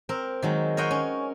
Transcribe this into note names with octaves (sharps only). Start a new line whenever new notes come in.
C4 A#4
D#3 F#3 G#3
A#4 C5 C#5 D#5 F#5 G5
C#4